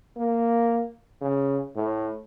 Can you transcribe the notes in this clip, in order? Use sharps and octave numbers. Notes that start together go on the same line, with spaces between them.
A#3
C#3
A2